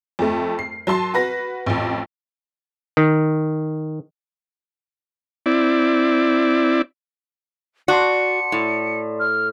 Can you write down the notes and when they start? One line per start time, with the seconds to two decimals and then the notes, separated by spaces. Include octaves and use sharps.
0.19 F2 A3
0.59 C7
0.87 F#3 A5 C6 C7
1.14 F#4 B4 A#6
1.66 A1 F2
2.97 D#3
5.46 C4 E4 D5
7.88 F#4 D5 A5 C6 C#7
8.52 A2
9.20 F6